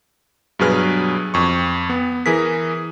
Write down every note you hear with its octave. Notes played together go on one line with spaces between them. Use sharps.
G2 B2 F#3 G#4 B4 F6
F2 C#6
B3
E3 G#4 A#4 B6